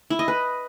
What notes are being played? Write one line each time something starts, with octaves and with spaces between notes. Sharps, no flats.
E4
D#5
B4